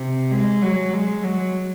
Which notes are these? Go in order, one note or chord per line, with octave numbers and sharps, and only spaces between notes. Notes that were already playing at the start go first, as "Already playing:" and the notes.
Already playing: C3
G#3
F#3
G#3
F#3